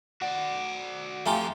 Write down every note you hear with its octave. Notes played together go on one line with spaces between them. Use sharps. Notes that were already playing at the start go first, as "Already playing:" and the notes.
F#4 D5 F#5
F2 F3 A3 F4 G4 F5 G#5 A#5